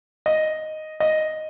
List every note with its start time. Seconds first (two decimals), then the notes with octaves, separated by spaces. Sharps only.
0.26 D#5
1.00 D#5